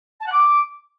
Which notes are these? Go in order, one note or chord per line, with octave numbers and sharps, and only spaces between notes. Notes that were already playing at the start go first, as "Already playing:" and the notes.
A5
F#5
D6